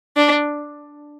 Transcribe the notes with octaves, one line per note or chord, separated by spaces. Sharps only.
D4